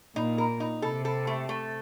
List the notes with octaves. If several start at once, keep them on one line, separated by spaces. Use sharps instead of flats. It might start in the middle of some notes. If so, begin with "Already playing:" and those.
A#2 D#4
A#4
D#4
C3 A4
A4
A3
A3